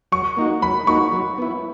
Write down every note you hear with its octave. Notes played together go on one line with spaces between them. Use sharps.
F#3 C#6
A#3 D#4 F#4
F#3 B5
A#3 D#4 F#4 C#6
F#3
B3 E4